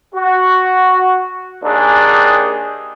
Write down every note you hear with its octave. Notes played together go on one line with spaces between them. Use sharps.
F#4
D#2 D#3 D4 G#4